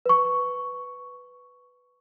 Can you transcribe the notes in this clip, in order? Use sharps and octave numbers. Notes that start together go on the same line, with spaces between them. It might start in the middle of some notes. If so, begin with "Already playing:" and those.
B4 C#6